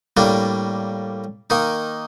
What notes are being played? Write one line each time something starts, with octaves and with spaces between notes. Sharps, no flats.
A2 G3 A#3 D4
D#3 A#3 D#4